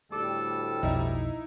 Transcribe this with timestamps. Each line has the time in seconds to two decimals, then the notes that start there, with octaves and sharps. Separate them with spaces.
0.12 D2 A2 G3 A4 D6
0.83 B1 F2 D#4 E4